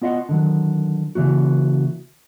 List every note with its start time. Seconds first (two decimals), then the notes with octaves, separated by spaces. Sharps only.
0.02 B3 F4 D#5 E5 F#5
0.29 D3 D#3 F#3
1.15 C#3 E3 A#3 F#4